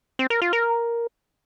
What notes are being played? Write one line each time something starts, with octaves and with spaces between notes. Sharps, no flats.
C4
A#4
F4
A#4